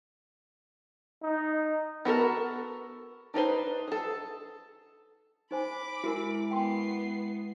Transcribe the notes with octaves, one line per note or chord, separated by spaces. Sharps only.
D#4
B3 F#4 A4 A#4
D4 D#4 B4 C5
G#4 A4
D#4 C5 G#5 B5 D6
G#3 E4 F#4 A#4 G#5
B3 G5 C6 C7